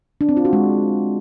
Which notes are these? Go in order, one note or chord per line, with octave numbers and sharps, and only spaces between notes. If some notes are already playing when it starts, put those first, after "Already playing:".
D4
C4
F4
F#4
G#3